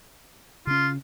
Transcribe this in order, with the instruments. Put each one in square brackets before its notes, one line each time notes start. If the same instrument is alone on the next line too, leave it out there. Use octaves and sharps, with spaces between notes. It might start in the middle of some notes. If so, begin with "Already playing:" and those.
[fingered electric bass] C#3 C#4 [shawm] F4